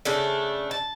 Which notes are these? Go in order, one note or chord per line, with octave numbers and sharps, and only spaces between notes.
C#3 A3 D4
A5